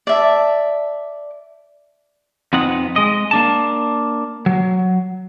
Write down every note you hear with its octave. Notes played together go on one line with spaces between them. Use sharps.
D5 E5 A5
F2 B3 C4 D#4 F#5
G#3 D#5
A#3 D4 A5
F#3